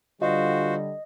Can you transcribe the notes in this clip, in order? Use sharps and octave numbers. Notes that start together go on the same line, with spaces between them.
D3 G3 F4 F#4 C5 D#5